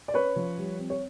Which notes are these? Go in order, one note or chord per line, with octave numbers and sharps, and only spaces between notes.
D5
C#4 B4 C#5
F3
G3
C4
C#5